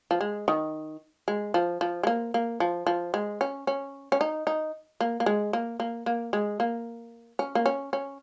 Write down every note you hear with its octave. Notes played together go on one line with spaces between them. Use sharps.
F3
G#3
D#3
G#3
F3
F3
G#3
A#3
A#3
F3
F3
G#3
C#4
C#4
C#4
D#4
D#4
A#3
A#3
G#3
A#3
A#3
A#3
G#3
A#3
C#4
A#3
C#4
C#4